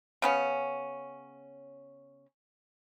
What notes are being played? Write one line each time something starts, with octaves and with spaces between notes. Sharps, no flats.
C#3 B3 C#4